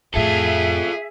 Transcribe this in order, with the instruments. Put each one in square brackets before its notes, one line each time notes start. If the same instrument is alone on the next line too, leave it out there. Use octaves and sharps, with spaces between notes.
[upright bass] F2 A2 [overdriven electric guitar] F4 A4 [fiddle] G#4 [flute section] E5